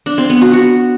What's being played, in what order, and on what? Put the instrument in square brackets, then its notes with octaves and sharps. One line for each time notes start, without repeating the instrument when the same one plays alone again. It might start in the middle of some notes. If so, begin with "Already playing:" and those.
[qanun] D4
C4
B3
F#4
F#4